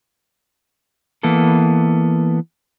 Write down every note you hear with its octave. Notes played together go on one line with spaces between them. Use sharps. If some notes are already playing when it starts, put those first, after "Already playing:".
E3 A#3 B3 A4